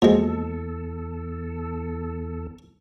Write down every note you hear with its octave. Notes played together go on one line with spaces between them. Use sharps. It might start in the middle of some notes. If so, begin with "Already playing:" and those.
E2 F3 G#3 A#3 F#4 A4 D#5